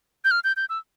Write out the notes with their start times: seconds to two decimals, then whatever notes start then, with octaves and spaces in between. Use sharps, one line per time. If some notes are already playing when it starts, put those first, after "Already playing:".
0.25 G6
0.31 F6
0.44 G6
0.57 G6
0.70 E6